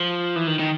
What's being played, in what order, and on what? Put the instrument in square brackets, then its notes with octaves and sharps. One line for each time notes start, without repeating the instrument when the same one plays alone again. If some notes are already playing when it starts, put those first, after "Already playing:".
Already playing: [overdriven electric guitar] F3
E3
D#3
D#3